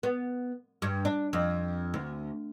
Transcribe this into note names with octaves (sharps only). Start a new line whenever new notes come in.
B3
G2
D4
F2
D2